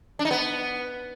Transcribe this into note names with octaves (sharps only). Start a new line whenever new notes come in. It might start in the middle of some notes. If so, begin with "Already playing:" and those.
D4
D#4
B3